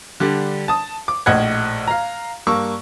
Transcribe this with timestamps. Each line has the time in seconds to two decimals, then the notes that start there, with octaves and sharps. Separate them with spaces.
0.20 D3 G3 D4
0.68 A5 D#6
1.08 D6
1.26 A#1 A2 D#5 F#5 F#6 G#6
1.88 F5 A#5
2.47 G2 A#3 C#6 E6